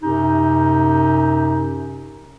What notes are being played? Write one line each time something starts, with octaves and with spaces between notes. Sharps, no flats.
F#2 C3 C#4 D#4 G4